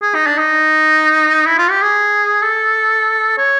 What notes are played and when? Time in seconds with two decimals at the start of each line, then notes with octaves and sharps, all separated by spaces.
0.02 G#4
0.15 D#4
0.27 D4
0.38 D#4
1.46 E4
1.58 F4
1.70 G4
1.82 G#4
2.42 A4
3.38 C#5